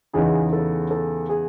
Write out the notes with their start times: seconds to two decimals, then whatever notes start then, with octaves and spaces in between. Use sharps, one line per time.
0.13 E2 C#3 E3 B3 D#4 G#4
0.53 A4
0.91 A4
1.29 G#4